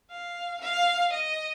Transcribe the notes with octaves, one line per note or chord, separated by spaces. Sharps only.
F5
F5
D#5